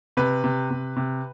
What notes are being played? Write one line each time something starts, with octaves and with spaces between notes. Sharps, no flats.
C3 B4
C3
C3
C3